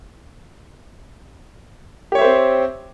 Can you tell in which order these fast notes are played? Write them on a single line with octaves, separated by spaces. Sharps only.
G4 C#5 E5 C5 C4